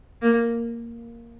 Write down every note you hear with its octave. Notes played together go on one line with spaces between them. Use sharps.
A#3